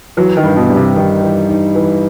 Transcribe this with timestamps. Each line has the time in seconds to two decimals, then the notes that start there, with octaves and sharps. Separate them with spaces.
0.17 E3 F#3
0.37 D#3
0.44 G2
0.56 B2
0.70 G3
0.76 C3
0.96 D#3 D#4
1.22 E3
1.49 D#4
1.75 E3